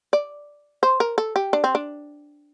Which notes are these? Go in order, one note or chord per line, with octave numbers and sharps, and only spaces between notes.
D5
C5
A#4
A4
G4
D4
C4
D4